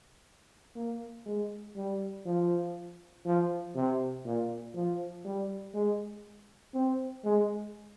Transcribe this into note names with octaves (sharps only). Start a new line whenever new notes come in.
A#3
G#3
G3
F3
F3
C3
A#2
F3
G3
G#3
C4
G#3